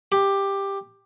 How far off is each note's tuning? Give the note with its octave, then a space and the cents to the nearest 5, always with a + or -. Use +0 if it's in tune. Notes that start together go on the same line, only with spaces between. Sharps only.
G4 +10